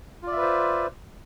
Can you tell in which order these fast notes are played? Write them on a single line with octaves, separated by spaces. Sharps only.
F4 D5 E5 B4 C5